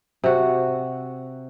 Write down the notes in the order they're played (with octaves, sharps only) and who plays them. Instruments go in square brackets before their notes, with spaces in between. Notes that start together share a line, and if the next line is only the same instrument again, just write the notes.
[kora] C3 F#4